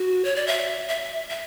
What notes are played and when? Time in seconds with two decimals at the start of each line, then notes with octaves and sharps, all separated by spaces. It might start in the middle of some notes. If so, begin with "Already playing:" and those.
Already playing: F#4
0.25 C#5
0.36 D5
0.47 E5
0.89 E5
1.30 E5